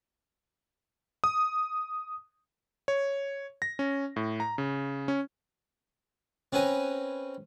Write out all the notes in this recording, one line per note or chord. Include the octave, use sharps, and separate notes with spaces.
D#6
C#5
A#6
C#4
A2
A#5
C#3
C#4
C4 C#4 B4 G#5 A#5